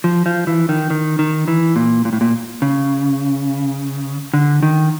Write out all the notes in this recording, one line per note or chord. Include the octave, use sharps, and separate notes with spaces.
F3
F3
E3
D#3
D#3
D#3
E3
A#2
A#2
A2
A#2
C#3
D3
D#3